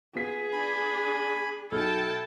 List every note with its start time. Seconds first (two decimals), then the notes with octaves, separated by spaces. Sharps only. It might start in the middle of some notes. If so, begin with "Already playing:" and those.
0.15 B3 F4 G#4 B6
0.53 D4 G#5 B5
1.72 B1 E4 F#4 A4 G5 A5 F6